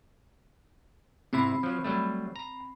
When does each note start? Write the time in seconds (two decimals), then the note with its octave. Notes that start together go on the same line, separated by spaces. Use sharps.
1.33 G#2 C3 C4 E4 B5
1.63 F3 F#3
1.84 F#3 G3 A3
2.36 A#5